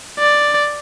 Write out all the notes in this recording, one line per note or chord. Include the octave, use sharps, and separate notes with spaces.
D5